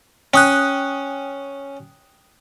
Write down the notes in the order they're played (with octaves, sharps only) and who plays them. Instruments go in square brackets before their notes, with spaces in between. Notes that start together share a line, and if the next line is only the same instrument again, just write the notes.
[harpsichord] C#4 [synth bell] G5 D#6 F#6